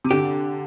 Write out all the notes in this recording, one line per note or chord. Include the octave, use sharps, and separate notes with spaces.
C3
D3 G4